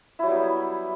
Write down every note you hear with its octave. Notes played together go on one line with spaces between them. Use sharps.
F#3 G3 B3 E4